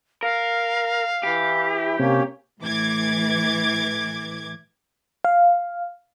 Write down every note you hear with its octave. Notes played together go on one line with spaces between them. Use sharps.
A#4 F5
E3 E4 G4
C3 A#3 C#4 C#5
A2 E3 D6 G#6
F5